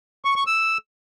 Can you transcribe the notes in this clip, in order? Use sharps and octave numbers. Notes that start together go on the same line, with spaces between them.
C#6
C#6
E6